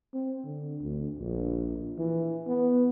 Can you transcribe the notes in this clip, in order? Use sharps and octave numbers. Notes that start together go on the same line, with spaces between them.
C4
D3
D2
A#1
E3
B3